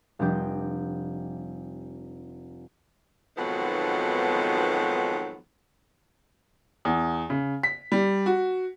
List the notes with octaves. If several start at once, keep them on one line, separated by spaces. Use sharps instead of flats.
F1 G3 D4 G4 D#5 G5
F2 G#2 B2 D#3 F#3 B3
E2
C#3
B6
G3
F#4